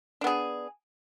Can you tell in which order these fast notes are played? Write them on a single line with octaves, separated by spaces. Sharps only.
D4 B3 G#4